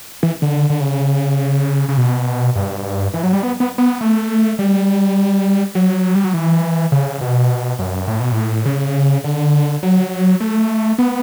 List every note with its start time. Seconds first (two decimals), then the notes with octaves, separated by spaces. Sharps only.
0.23 E3
0.42 D3
0.70 D3
0.80 C#3
1.89 C#3
1.97 B2
2.56 G2
3.14 E3
3.23 F#3
3.33 G3
3.43 B3
3.60 B3
3.78 B3
4.01 A3
4.59 G3
5.75 F#3
6.15 G3
6.24 F#3
6.34 E3
6.92 C#3
7.21 B2
7.79 F#2
8.07 A2
8.20 B2
8.32 A2
8.65 C#3
9.24 D3
9.83 F#3
10.40 A3
10.98 B3